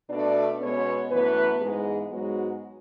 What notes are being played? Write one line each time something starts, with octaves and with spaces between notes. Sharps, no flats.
B2 A3 D4 D5
B2 G#3 B3 C#4 C#5
F#2 E3 A3 B3 B4
G#2 E3 G#3 B3 G#4
G#2 F#3 G#3 B3 F#4